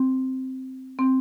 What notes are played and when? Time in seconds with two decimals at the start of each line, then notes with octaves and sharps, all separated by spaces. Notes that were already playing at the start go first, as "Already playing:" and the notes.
Already playing: C4
0.99 C4